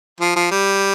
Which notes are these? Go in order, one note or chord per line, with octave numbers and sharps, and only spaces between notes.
F3
F3
G3